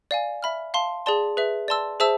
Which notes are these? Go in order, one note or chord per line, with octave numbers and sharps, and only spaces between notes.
D5 F5 G#5
E5 B5 F6
F5 A5 C6
G#4 D5 A5 C6
G#4 B4 E5
D5 A5 C6 E6
G#4 C5 E5 A5 E6